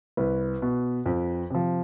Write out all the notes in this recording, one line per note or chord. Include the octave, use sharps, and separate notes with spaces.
C2 B4
B2
F2
C3 F3